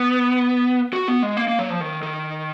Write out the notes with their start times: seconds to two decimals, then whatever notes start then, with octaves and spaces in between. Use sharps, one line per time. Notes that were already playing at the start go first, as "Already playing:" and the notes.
Already playing: B3
0.93 F#4
1.08 B3
1.23 G#3
1.37 A#3
1.48 A#3
1.59 F#3
1.70 F3
1.80 D#3
2.02 D#3